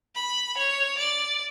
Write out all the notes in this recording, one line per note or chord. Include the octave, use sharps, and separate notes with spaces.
B5
C#5
D5